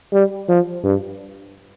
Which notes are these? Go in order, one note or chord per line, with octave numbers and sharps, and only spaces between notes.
G3
F3
G2